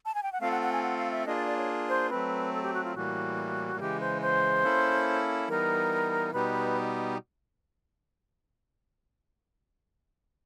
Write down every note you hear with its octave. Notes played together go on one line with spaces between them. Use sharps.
A5
G#5
G5
F#5
A3 C4 F4 A4 F5
F#5
F#5
G#5
F#5
F5
E5
A#3 D4 F4 G#4 D#5
D5
D5
C#5
C5
F#3 A3 C4 B4
A4
G4
F#4
F4
A2 E3 G3 A#3 F#4
C#3 E3 G#3 G4
C5
C5
A#3 C#4 E4 A4
E3 G3 B3 D#4 A#4
B2 G3 B3 D#4 G4 B4